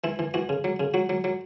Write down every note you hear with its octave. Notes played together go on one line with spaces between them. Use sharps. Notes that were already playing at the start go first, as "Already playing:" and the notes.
E3 E4
E3
E3 F#4
C#3
F#3
C#3
F#3 F#4
F#3
F#3